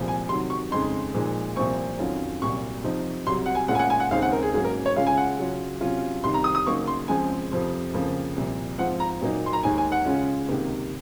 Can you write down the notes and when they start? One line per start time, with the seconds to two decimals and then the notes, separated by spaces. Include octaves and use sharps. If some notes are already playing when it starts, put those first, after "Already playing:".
Already playing: C2 A#2 F3 G#3 C4
0.08 G#5
0.29 C3 D#3 F#3 C6
0.50 C#6
0.71 F2 C#3 G#3 D#4 C6
1.14 A#2 F3 G#3 D#4
1.56 C2 A#2 F3 C4 C#6
1.98 F2 D#3 F#3 C#4 F4
2.41 C2 A#2 F#3 C#6
2.84 C3 F3 C4 D#4
3.27 C2 C3 F#3 C6
3.46 F#5
3.55 G#5
3.68 A#2 G#3 C#4 F4 F#5
3.75 G#5
3.79 F#5
3.90 G#5
4.00 F#5
4.11 D#2 C#3 G#3 C4 D#4 F5
4.22 F#5
4.32 A#4
4.43 G#4
4.54 G#2 F#3 A#3 C#4 G#4
4.64 A#4
4.86 C#5
4.96 C#3 G#3 C#4 F4 F5
5.07 G#5
5.17 F#5
5.38 C#3 F#3 C#4 F4
5.81 C3 F#3 C#4 F4
6.24 C2 C3 D#3 C6
6.34 A#5
6.44 D#6
6.55 D#6
6.67 C#3 F#3 A#3 D#4 C#6
6.87 C6
7.08 C#2 C#3 F3 G#3 C4 G#5
7.51 F2 C3 F3 C4
7.93 F2 C#3 F3 A#3
8.36 C2 A#2 F3
8.79 G#2 F3 C4 F4 F#5
9.00 A#5
9.21 A#2 F#3 A#3 D#4
9.46 C6
9.53 A#5
9.63 D#2 D#3 G#3 G#5
9.78 G#5
9.92 F#5
10.05 C#3 G#3 C#4 F4
10.49 C#2 C3 D#3 A#3